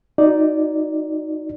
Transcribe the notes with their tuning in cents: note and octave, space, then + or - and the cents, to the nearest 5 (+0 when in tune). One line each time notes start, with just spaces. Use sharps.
D#4 +0 F#4 -20 D5 +0